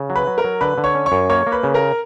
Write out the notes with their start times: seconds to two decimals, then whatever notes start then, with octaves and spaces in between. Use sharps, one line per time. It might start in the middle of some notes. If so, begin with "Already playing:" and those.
Already playing: C#3
0.10 F#3
0.16 B4 B5
0.27 F#3
0.38 A#4 A#5
0.44 F#3
0.61 D3 B4 B5
0.78 D3
0.84 C#5 C#6
0.95 C#4
1.06 C#5 C#6
1.12 F#2
1.29 A#3 C#5 C#6
1.47 A#3
1.52 B4 B5
1.63 C#3
1.74 A#4 A#5